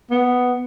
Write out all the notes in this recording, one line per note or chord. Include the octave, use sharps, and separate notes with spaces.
B3